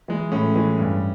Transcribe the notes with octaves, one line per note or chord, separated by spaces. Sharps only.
E3 G#3
A2 C#4
E3 G#3
G2